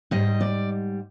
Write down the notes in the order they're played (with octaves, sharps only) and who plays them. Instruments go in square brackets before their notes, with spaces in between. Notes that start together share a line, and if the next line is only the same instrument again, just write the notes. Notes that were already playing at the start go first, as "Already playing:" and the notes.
[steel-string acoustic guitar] G#2 G3 D#5
D5